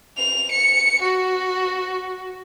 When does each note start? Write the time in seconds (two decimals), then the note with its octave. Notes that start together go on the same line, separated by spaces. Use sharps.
0.17 F7
0.51 C#7
1.02 F#4